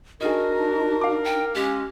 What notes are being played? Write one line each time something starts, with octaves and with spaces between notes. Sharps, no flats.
D4 D#4 F#4 G#4 A#4 D#5
F5 D6
G5
G#3 C#4 G4